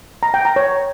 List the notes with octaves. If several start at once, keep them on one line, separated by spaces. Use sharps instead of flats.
A#5
G5
A#5
C#5